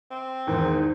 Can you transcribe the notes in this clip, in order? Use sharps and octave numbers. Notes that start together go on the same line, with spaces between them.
C4
E2 G#2 D#3